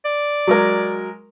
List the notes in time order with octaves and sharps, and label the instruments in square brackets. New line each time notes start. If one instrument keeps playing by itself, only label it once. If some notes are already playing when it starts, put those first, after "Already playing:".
[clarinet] D5
[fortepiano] F#3 G#3 A#4